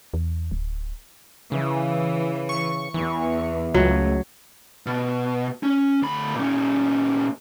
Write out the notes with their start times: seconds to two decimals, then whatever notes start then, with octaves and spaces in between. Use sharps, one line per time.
0.14 E2
0.51 D1
1.52 C#3 E3
2.49 C#6
2.94 E2 E3
3.74 C#2 F#2 F#3 A3
4.86 B2
5.63 C#4
6.02 D2 B5
6.36 A#2 C#4